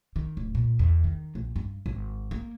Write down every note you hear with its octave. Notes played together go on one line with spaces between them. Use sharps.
D#3
D1
A#2
E2
D#3
A#1
G2
G#1
A#3